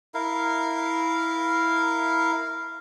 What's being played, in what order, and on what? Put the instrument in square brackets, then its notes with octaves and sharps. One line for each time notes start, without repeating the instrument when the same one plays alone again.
[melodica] E4 A#4 F5